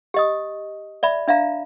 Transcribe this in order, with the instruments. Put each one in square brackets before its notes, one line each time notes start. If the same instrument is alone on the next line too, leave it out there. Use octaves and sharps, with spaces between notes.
[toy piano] G4 D#5 D#6
D5 E5 B5
D4 E5 F5 A#5